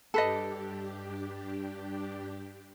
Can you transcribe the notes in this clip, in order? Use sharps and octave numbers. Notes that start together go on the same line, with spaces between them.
G2 D4 G4 A4 B4 D#5